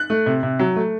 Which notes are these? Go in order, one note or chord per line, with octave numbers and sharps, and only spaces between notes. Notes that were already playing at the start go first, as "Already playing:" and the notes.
Already playing: F#6
A3
C3
C3
F#3
A3